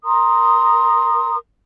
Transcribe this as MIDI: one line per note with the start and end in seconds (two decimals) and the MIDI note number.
0.05 1.36 70
0.05 1.36 82
0.05 1.36 84
0.05 1.36 87